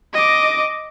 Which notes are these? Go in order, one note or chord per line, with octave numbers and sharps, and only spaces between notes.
D#5 D6